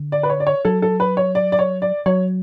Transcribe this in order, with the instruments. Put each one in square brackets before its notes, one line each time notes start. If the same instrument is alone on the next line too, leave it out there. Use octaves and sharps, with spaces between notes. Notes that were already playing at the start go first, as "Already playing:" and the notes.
Already playing: [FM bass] D3
[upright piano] D5
B4
C#5
D5
C#5
[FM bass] F#3 [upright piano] A4
[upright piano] A4
B4
C#5
D5
D5
C#5
D5
[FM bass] F#3 [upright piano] C#5